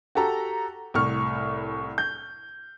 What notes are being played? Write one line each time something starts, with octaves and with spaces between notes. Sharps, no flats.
F#4 G4 A4 A#5
C2 A2 C#6 F6
G6